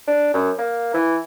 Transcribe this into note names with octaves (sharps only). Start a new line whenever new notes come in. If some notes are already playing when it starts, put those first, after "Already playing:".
D4
F#2
A#3
E3